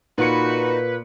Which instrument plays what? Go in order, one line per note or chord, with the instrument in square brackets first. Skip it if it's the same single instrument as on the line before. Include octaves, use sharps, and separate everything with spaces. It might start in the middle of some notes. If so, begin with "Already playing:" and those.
[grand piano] A#2 A#3 C#7 [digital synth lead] D#4 [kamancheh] F#4 [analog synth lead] B4